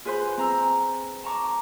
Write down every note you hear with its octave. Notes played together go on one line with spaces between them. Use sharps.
F4 G#4 B4 C5 C6
C4 A#5 E6
A5 A#5 C#6 D6